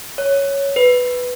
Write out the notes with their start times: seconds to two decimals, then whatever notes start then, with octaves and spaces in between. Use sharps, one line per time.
0.18 C#5
0.76 B4